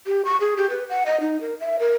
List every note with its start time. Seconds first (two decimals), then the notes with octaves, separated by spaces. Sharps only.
0.07 G4
0.25 C#6
0.41 G#4
0.57 G4
0.70 B4
0.89 F#5
1.06 D#5
1.20 D#4
1.41 A#4
1.60 E5
1.79 A#4